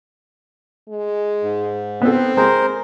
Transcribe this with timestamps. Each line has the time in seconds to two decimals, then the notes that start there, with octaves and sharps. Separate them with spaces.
0.89 G#3
1.42 G#2
2.02 B3 C4 A4
2.37 G#3 A#4 C5